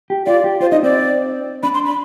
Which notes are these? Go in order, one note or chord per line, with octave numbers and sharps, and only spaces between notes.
G4
F4 D5
G4
F4 C5
D#4 D#5
C4 D5
D4 B5
C6
B5